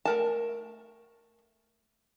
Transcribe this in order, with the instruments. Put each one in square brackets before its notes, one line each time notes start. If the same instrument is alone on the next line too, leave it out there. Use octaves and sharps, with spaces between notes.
[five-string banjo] A3 A#4 A5